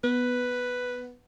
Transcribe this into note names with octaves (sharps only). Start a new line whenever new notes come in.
B3 B4